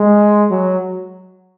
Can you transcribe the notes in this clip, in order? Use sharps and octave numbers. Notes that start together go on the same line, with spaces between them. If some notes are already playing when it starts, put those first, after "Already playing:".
Already playing: G#3
F#3